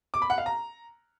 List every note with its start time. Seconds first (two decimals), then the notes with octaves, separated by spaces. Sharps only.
0.14 D6
0.22 B5
0.30 F#5
0.38 F5
0.46 A#5